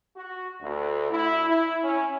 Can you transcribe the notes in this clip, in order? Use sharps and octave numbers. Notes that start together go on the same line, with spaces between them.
F#4
D2
E4
E4
C#4